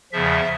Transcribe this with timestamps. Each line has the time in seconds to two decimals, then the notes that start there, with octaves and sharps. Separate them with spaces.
0.12 E2 C#3 F3 E5